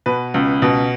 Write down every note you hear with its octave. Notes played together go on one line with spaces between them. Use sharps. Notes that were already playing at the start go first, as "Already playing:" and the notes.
B2 B4
C#2
B2